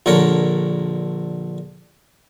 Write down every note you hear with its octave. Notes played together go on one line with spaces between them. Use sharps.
A#1 D3 A#4 C#5